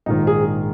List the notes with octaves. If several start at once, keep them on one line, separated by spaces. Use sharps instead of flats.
A#1 G#2 D#3 D#4
G#4